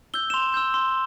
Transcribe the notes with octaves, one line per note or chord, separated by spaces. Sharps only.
E6 G6 G7
E7
C6 F7
E6 G6
C6